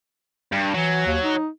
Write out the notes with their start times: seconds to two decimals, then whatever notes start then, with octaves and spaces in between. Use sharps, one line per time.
0.52 G2
0.74 E3 F#3
1.06 D#2
1.23 D#4